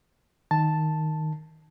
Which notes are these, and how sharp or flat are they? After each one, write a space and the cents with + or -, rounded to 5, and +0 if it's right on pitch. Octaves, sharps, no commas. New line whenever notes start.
D#3 +0 A5 +0